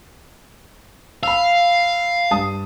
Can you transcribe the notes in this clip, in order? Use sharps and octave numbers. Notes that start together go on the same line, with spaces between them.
F5 B5 E6
G2 A5 D#6